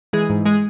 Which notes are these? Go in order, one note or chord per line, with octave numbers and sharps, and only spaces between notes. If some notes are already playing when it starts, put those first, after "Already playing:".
E3 G#3 G#4
G#2
G#3 G#4